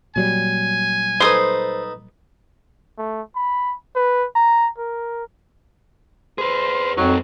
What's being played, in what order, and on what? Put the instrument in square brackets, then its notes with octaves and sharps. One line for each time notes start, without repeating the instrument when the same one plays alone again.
[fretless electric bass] A#2 F#3 G3 [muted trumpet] G#5
[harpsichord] D#4 A4 B4 [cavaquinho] C5 D#6
[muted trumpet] A3
B5
B4
A#5
A#4
[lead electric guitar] G#4 B4 [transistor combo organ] C5
[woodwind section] F2 [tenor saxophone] F#3 [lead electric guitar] C4 D#4